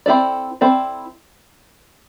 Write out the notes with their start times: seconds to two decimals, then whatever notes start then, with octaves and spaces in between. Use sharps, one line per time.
0.06 C4 E4 A4 D5
0.61 C4 E4 A4 D5